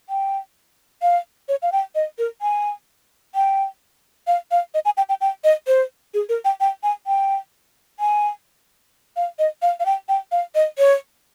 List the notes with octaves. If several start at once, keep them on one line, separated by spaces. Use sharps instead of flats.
G5
F5
C#5
F5
G5
D#5
A#4
G#5
G5
F5
F5
D#5
G#5
G5
G5
G5
D#5
C5
G#4
A#4
G5
G5
G#5
G5
G#5
F5
D#5
F5
F5
G5
G5
F5
D#5
C#5